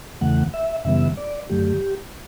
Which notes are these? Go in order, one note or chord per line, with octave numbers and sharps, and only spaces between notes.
E2 C#3 E3 A3 F#5
E5
F#2 C#3 E3 G3 B3 E5
D5
F#2 D3 F#3 A3 G4